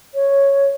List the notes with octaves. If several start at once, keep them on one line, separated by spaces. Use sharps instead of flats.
C#5